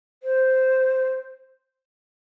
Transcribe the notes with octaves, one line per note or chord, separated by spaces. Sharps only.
C5